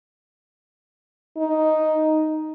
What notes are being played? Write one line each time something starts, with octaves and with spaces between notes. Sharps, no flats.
D#4